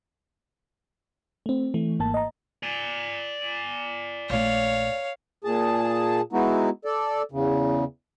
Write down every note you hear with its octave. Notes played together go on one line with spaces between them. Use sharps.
A3 C4
E3 A3
G#1 G#2 A#3 A5
D#5 A#5
D5 G#5
A#1 A3 C#5 F5
A#2 G#4 A5
G#3 B3 D#4 E4 F#4
A4 D5
E2 C#3